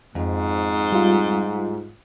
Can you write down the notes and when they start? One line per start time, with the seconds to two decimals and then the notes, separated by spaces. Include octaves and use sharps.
0.15 F2 G#2
0.92 G3 F4